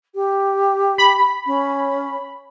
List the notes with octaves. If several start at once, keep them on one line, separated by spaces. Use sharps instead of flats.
G4
B5
C#4